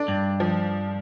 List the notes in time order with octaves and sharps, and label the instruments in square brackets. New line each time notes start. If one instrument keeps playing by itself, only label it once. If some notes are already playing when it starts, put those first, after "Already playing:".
Already playing: [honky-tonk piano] D4
[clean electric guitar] G2
[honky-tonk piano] F3